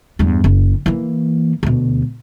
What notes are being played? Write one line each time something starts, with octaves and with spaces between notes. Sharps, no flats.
E2 G2
F#1
E3 A#3
D2 B2